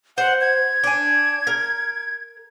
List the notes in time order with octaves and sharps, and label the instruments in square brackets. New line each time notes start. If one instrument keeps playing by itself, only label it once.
[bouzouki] C5 [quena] F#5
[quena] G#6
[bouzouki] D4 G#5
A#4